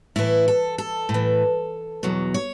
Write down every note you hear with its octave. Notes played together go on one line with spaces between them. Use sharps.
A2 E3 E4
A4
A4
A2
E3
E2 B2 F#3
C#5